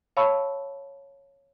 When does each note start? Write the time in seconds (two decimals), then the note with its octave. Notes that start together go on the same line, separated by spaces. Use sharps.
0.17 C#5 F5 A5 B5 C#6 E6